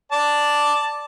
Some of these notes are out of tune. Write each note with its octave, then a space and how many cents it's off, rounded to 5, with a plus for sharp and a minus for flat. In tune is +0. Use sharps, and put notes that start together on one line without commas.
D5 +0 A5 +0